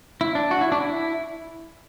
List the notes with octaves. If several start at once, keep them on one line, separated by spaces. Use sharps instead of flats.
E4
D4
F#4
E4
D4
E4